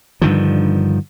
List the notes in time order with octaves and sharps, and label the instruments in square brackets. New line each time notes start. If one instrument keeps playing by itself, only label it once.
[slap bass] G2 D3 D#3 F3